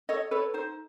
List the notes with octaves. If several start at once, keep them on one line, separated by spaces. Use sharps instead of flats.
A4 C#5 D#5
A4 B4 C#5
D#4 C5